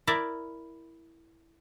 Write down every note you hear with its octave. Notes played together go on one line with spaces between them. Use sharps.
E4 A#4 D5 E5